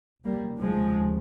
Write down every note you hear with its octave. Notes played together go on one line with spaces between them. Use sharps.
F1 D#2 C#3 G3 A#3
F3 G#3